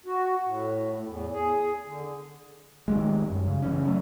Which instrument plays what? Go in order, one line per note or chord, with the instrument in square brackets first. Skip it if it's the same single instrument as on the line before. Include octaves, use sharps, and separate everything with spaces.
[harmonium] F#4
A2
A2
E2
G#4
D3
[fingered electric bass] D#3 G3 G#3
F#2
C#3
C#3 E3 C#4
F#3 A3